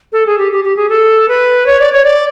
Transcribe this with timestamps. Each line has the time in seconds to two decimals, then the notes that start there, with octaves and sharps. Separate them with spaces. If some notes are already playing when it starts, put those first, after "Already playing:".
0.13 A4
0.27 G#4
0.38 G4
0.52 G4
0.64 G4
0.77 G#4
0.89 A4
1.28 B4
1.66 C#5
1.80 D5
1.92 C#5
2.05 D5